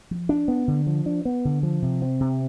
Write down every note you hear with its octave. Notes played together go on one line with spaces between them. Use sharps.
F3
D4
B3
D3
F3
D4
B3
D3
F3
C3
C4
C3